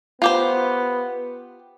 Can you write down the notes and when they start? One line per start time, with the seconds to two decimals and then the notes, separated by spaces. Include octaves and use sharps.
0.22 B3 F4 G4 C5